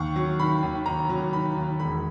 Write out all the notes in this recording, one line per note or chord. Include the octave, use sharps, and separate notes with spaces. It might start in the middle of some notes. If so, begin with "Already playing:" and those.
Already playing: D#2 C#6
F#3
D#3 B5
D#2
D#2 A#5
F#3
D#3 B5
D#2
E1 B5